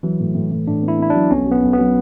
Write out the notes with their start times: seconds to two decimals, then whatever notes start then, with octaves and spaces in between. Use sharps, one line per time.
0.03 E3 F#3
0.20 A2
0.35 A2
0.51 A2
0.67 A2 D4
0.82 B3
0.88 E4
0.99 B3 E4
1.10 F#3 D4
1.31 B1 C#4
1.47 F#3 B3
1.63 B1
1.73 B3
1.79 F#3